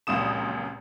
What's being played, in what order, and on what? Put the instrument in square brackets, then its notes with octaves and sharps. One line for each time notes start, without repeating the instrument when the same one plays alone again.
[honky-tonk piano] F1 C#2 F#2 A#2 D#6 E7